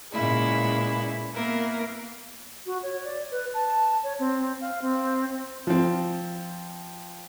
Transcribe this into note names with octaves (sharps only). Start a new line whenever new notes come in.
A#2 C#3 G#3 B3 E4
A#3 B3 E4 A#4
F#4
C#5
D5
B4
A5
C#5
C4
F5
C4
F3 C4